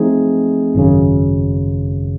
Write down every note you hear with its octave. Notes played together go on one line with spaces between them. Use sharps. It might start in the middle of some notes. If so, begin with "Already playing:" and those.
Already playing: F3 A3 C4 D#4 G#4
G#1 F#2 C#3